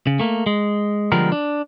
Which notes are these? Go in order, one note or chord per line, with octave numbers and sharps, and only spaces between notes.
C#3
A3 A#3
G#3
D3 F3 G3 G#3 B3 A#4
D4